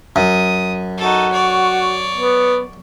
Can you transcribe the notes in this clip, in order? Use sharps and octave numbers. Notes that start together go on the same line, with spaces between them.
F#2 D#6
D#4 F#4 A4
C#5 D5
B3